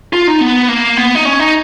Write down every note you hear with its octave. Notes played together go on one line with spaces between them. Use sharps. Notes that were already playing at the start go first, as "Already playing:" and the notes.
F4
D#4
B3
A#3
B3
D#4
C#4
D#4